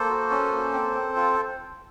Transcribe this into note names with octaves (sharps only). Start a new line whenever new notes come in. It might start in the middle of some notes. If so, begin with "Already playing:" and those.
Already playing: A#3 A4 C5
F#4
C#4
A#3
C4
C4
F4